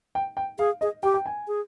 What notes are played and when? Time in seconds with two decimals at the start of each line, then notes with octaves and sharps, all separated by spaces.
0.15 G5
0.37 G5
0.59 G#4 F5
0.81 G#4 D#5
1.03 G4 G5
1.14 G5
1.26 G#5
1.48 G#4